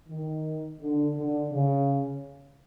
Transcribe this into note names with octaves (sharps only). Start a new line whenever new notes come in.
D#3
D3
D3
C#3